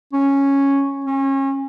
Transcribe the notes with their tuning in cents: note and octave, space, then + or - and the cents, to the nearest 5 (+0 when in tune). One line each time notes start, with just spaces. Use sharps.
C#4 -5
C#4 -30